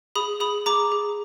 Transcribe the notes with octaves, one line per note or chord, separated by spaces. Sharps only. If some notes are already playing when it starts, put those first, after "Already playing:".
G#4 B5 D#6
G#4 B5 D#6
G#4 A#5 D6
G#4